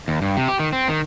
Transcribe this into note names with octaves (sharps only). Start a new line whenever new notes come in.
D#2
G2
C3
G4
D#3
C4
D#3